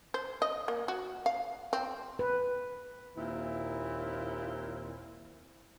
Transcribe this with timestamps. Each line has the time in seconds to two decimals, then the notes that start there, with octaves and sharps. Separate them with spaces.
0.14 C5
0.42 D#5
0.68 A#3
0.88 F#4
1.26 F5
1.73 C4
2.19 B4
3.16 D#2 A#2 C4 E4